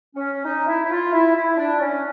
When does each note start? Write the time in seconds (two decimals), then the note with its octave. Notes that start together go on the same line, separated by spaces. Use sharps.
0.15 C#4
0.44 D#4
0.67 E4
0.82 E4
0.90 F4
1.12 E4
1.35 E4
1.57 D4
1.80 C#4